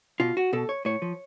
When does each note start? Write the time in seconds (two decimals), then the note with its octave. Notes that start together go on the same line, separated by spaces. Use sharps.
0.20 B2 F4
0.37 F#4
0.53 B2 A4
0.69 C#5
0.85 A2 C#5
1.02 F3